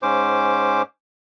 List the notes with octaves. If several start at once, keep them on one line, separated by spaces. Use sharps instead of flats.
G#2 C#4 C5 D6